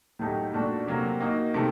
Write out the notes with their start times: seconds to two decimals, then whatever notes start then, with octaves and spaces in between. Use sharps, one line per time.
0.19 A2 F#3 A3 D#4 G4
0.53 A#2 A3 D4 F#4
0.87 C3 F#3 A#3
1.21 A#3 D#4 F#4
1.54 C3 D#3 A3